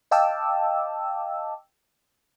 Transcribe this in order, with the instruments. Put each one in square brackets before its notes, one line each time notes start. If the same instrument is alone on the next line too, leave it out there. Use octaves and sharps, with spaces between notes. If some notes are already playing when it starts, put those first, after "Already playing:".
[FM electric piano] D#5 F5 G5 A5 D6 E6